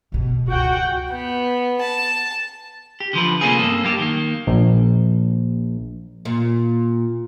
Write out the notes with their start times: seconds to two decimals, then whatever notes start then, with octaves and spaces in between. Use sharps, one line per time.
0.12 D1 B2
0.47 C#2 F#2 F#4 F#5 G5
1.11 B3
1.81 A5
3.00 G4
3.13 D3 F3 B4
3.41 C3 A3 A#3 C#4 F4 G#4
3.59 G2 A#3 A4
3.84 F#2 A#3 G4
3.99 D#3 A#3
4.47 A#1
6.25 A#2